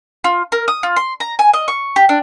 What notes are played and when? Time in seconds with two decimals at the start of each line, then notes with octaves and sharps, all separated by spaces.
0.24 F4
0.52 A#4
0.68 D#6
0.83 F4
0.96 C6
1.20 A#5
1.39 G#5
1.53 D#5
1.68 C#6
1.96 G4
2.09 D4